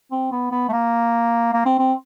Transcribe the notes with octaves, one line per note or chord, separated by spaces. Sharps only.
C4
B3
B3
A3
A#3
A#3
C4
C4